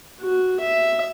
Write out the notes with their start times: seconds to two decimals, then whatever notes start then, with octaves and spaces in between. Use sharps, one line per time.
0.21 F#4
0.60 E5